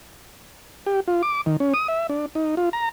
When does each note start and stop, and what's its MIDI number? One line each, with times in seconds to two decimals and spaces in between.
0.86 1.00 67
1.08 1.22 65
1.23 1.41 86
1.46 1.57 51
1.60 1.74 61
1.74 1.87 87
1.88 2.07 76
2.09 2.26 62
2.35 2.55 63
2.57 2.69 65
2.73 2.89 82